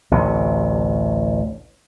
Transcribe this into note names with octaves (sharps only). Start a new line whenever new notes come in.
A1 D2 C3